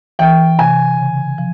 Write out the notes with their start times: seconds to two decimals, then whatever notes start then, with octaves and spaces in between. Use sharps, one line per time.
0.19 E3 G5
0.59 C3 G#5
0.98 C#3
1.38 F3